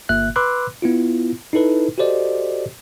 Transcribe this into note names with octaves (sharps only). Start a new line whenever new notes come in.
G1 A#3 E5 F#6
B4 B5 C6 D6 E6 F#6
B3 E4 F4
D#4 E4 A4 B4
F#4 G4 A4 C5 D5 D#5